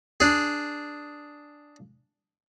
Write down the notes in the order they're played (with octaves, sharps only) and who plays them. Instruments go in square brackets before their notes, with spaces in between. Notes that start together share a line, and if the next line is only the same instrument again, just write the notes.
[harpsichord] D4 G#4